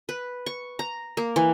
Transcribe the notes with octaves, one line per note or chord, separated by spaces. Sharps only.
B4
C#6
A#5
A#3
E3